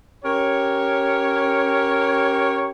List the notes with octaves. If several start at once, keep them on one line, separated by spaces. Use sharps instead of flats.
C#4 G4 A#4 C#5